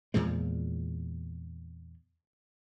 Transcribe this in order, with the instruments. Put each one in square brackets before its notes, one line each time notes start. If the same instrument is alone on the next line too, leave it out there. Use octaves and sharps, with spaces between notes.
[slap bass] E2 A#2 F3 G#3